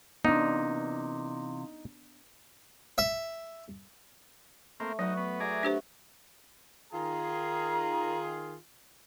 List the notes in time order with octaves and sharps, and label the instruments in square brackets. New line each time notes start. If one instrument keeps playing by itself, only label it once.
[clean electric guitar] C3 E3 A#3 [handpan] B3 D4 [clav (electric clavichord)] D#4
[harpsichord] E5
[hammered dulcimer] A3 [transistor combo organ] A#3 C4
[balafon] F#3 [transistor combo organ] D#4 [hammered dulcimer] F#4 B4 C#5
[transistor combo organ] B3
[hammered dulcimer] F#4 E5 [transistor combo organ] G#4 D5 A#5
[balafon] D4 G4 C5
[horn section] D#3 F4 G#4 [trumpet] A#5